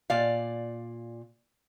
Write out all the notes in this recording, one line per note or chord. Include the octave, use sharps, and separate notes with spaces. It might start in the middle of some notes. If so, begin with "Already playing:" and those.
A#2 D5 F5